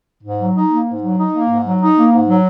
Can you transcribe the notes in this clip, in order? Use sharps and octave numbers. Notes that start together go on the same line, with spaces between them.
G#2
F#3
D#4
A#3
G#2
F#3
D#4
A#3
G#2
F#3
D#4
A#3
G#2
F#3